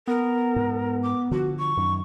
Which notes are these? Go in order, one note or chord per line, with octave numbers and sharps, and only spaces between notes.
B3 A#4
G#2
D6
D3 F3 F#4
C#6
F#2 D#3